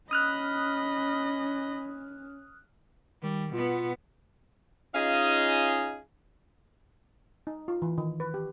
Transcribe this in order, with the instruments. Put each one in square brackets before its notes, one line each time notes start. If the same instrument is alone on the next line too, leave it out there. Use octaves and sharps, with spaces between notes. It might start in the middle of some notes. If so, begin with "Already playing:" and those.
[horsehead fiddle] C#4 [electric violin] D#5 B5 [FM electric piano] D#6 F6 F#6
[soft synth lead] D#3 [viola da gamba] G3
[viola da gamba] B2 B3 [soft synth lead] F4
[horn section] C#4 D#4 F4 G#4 D#5 F5
[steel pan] D#4
F4
E3
D#3
B4
G4